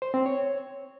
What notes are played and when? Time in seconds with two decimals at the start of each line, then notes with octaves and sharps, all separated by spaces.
0.02 C5
0.14 C4
0.26 C#5